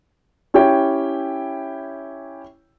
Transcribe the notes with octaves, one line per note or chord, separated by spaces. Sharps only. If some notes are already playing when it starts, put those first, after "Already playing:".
C#4 E4 G4 C#5 G5